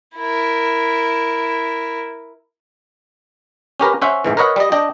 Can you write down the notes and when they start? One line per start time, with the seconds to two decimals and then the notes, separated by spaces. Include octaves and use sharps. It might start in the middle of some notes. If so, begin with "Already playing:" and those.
0.16 E4 A#4
3.80 C#4 G4 A#4 B4
4.02 C#4 C5 E5 F#5
4.25 A1 G#2 E3
4.37 A#4 B4 C#5 D#5 F#5
4.56 G3 D#5
4.72 D4 D#5 G5